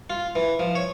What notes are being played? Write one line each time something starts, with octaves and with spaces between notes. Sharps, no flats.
F4
E3
F3
C#5